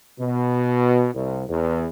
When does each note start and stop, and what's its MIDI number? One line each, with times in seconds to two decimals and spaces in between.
0.20 1.07 47
1.15 1.44 36
1.48 1.87 40